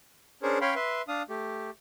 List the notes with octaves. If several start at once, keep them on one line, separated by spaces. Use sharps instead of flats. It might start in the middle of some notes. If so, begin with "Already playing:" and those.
C#4 D4 G#4 A#4 C5 C#5
C#4 C#5 F5 G5 B5 C6
B4 E5 C6
D4 F5 D#6
A3 G4